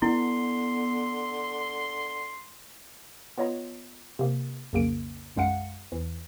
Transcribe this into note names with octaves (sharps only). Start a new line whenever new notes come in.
D3 B3 E4 C6
B3 F4 C#5 D#5 A#5
C3 A#3
B1 F2 C#3 A#3 D7
B1 F#2 G#3 F5 F#5 C#7
E2 E3